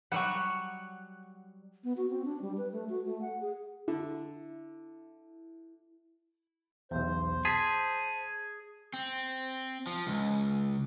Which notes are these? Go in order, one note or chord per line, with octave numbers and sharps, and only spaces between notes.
F#3 G3 F#5 C#6
B3
F#4
C4
D4
G3
B4
A3
F#4
A3
F#5
G#4
D3 E4
B1 E2 C5
G#4 A5 B6
C4
F3
C#2